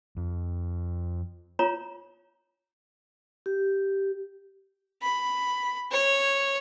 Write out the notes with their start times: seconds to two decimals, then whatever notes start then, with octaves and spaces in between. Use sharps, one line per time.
0.17 F2
1.59 F4 C#5 A#5
3.46 G4
5.02 B5
5.91 C#5